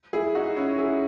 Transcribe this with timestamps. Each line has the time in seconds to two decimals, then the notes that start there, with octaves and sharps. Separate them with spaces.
0.13 E4 G#4
0.35 D#4 F#4
0.57 C#4 E4
0.78 E4 G#4